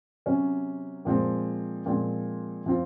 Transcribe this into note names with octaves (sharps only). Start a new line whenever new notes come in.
C3 F#3 C#4
A#2 F3 G#3 C4
A#2 F3 G#3 C4
F3 C4 F4